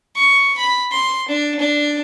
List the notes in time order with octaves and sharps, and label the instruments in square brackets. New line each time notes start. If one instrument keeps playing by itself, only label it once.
[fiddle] C#6
B5
C6
D4
D4